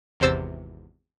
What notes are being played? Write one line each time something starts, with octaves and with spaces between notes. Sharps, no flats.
G#1 E2 C3 C5 E6 A6